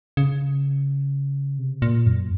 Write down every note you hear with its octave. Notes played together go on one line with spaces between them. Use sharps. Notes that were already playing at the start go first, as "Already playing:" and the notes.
C#3
C3
A#2
F#2